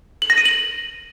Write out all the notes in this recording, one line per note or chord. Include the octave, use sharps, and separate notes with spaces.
F#7
A#6
D#7
F#7